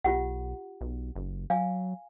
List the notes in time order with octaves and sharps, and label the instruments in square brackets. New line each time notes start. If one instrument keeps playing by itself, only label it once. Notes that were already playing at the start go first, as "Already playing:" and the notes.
[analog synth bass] B1 [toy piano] F4 G4 F#5
[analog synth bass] B1
F#1
[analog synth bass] F#3 [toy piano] F5 G#5